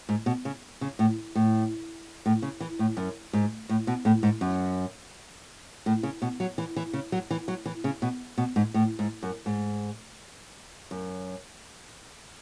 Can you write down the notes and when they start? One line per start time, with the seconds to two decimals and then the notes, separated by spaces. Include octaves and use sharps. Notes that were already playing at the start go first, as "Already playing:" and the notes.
0.09 G#2
0.26 B2
0.45 C#3
0.81 C#3
0.99 A2
1.35 A2
2.26 A2
2.42 C#3
2.60 E3
2.79 A2
2.97 F#2
3.33 G#2
3.69 A2
3.87 B2
4.05 A2
4.23 G#2
4.41 F#2
5.86 A2
6.03 C#3
6.22 B2
6.40 F#3
6.58 E3
6.76 E3
6.93 C#3
7.12 F#3
7.31 E3
7.48 F#3
7.66 E3
7.84 C#3
8.02 B2
8.38 B2
8.56 G#2
8.74 A2
8.99 G#2
9.23 F#2
9.46 G#2
10.91 F#2